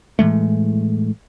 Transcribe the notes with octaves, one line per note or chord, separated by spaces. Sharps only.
A2 E3 G#3 A3